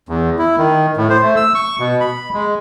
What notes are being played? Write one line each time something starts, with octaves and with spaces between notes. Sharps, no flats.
E2
E4
D#3
A2
C5
A3
E6
C#6
B2
B5
G#3